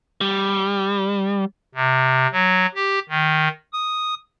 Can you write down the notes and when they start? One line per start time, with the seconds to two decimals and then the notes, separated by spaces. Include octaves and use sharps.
0.21 G3
1.75 C3
2.33 F#3
2.75 G4
3.09 D#3
3.73 D#6